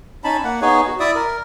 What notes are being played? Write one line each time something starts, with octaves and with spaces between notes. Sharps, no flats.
C#4 D#4 A5 B5
A#3 F#5
B3 D#4 G#4 C#5
F#4
E4 D5 E5 D#6
A#4